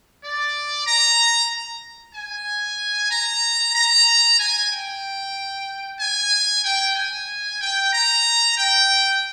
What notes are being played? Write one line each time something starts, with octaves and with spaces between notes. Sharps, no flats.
D5
A#5
G#5
A#5
A#5
G#5
G5
G#5
G5
G#5
G5
A#5
G5